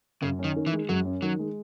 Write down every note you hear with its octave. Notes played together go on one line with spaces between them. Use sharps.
F#2 C#3
C#4
D#3
D#3
E3
G#3
F#2 F#3
C#4
D#3 F#3
G#3